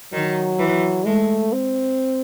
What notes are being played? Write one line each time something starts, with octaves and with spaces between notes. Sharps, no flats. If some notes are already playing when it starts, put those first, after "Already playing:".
D#3 F#3
E3
G#3 A3
C4